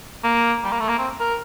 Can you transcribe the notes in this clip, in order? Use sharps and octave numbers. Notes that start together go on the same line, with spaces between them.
A#3
G3
A#3
A3
A#3
C4
A#4